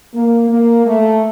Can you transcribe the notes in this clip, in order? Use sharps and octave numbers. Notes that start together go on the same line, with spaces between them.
A#3
A#3
A3